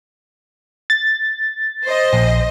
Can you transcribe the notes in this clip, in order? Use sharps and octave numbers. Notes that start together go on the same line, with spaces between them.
A6
C5 D#5
A#1